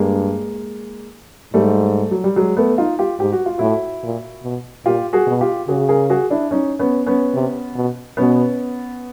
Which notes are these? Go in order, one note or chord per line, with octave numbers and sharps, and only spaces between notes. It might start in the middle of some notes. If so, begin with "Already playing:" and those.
Already playing: G2 G#3 A#3
G#2 G3 A3
F#3
G3
F#3 G#3
A3 B3
D#4 F4
F4 G4
G#2 G4
F#4
F4
A2 E4 F#4
A#2
B2
A#2 F4 G4
F#4 G#4
B2
F4 G4
C#3 F#4 G#4
G#4 A#4
F#4 G#4
D4 E4
C#4 D#4
B3 C#4
B3 C#4
C3
B2
B2 B3 C#4